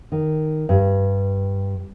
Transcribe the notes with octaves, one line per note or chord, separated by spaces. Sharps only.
D#3
G2